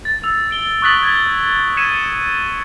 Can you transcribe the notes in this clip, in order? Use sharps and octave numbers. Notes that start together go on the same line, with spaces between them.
A6
E6 F7
D7 G7
C#6 D#6 F#6 A6 B6 F#7
G#6 B6 F#7 G7
E6 G#6 B6 C#7 D#7 E7